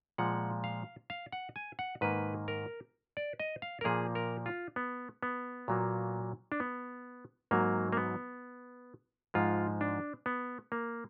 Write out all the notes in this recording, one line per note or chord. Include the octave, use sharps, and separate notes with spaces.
A#2 F3 G#3 F#5
F5
F5
F#5
G#5
F#5
G#2 D#3 A#3 B4
A#4
D5
D#5
F5
A#4
A#2 F3 A#3 G#4
A#4
F4
B3
B3
A#2 F#3 A#3
D4
B3
G#2 F#3 A#3
A#3
B3
G#2 F3 G#3 F4
D4
B3
A#3